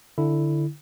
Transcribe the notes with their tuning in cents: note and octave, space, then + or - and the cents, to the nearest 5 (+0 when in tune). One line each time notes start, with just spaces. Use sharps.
D3 +0 E4 +0